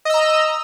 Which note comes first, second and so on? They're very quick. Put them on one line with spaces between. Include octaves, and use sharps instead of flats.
D#5 E6 A#5